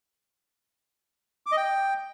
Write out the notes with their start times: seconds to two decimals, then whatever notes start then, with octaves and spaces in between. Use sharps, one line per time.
1.46 D6
1.52 D#5
1.57 G5